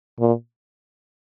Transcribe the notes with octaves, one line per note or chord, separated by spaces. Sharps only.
A#2